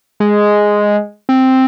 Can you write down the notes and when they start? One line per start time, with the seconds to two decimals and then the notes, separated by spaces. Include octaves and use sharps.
0.20 G#3
1.29 C4